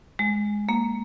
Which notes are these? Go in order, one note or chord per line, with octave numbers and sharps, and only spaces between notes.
G#3
A#3